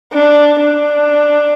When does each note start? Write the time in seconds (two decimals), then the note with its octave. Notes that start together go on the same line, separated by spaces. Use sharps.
0.13 D4
0.60 D4